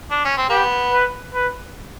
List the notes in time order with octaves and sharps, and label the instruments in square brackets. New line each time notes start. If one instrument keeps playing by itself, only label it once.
[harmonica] D4
C#4
C4
[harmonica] B3 [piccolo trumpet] G4
[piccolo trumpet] B4
B4